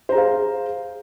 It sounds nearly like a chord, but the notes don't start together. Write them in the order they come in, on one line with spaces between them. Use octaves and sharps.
C5 A#5 G#4 F5